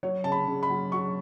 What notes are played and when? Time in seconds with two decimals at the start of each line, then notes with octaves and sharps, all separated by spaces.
0.03 F#3 C#5
0.24 C#3 A5
0.32 B5
0.47 C#3
0.63 B5
0.70 F#3
0.92 F#3 C#6